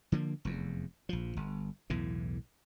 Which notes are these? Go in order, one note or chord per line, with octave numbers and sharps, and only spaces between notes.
D3 F3 A#3
F1 E2
A#1 F3
G1
B1 E2 A2 E3